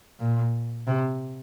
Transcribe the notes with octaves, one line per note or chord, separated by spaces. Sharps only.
A#2
C3